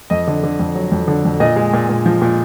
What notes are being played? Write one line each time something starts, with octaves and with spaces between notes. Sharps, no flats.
F2 D#5
D3
D3
F2
F#3
F2
D3
F2
A#2 D#5
G#3
A#2
A#2
F3
A#2